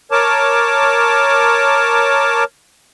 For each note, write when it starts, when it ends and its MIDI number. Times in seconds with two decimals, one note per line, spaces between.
0.11 2.44 70
0.11 2.44 73
0.11 2.44 81
0.11 2.44 86